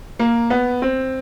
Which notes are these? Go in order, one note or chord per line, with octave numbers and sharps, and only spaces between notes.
A#3
B3
C4